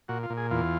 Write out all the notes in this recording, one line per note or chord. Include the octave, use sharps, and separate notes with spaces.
A#2 F#4
F4
A#2
G#4
E2 F4